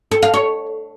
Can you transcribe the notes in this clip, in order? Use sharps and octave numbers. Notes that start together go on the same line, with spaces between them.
A4
F5
C#5